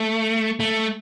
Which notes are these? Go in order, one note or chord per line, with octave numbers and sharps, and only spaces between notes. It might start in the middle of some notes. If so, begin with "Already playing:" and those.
Already playing: A3
A3